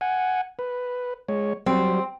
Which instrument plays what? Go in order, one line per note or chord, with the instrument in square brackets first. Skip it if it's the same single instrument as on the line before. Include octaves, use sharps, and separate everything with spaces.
[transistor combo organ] F#5 G#5
B4
G#3 C#5
[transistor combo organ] F#3 G3 [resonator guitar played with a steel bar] C4